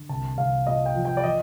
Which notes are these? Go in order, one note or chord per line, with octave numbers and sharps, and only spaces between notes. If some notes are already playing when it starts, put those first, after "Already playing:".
Already playing: D3
C2 A5
C2 F5
A#2 D#5
G5
F3
G5
D5
F3 D#5